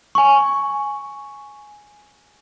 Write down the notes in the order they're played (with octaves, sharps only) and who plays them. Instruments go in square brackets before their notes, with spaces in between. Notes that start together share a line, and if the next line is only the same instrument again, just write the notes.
[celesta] G#5 C#6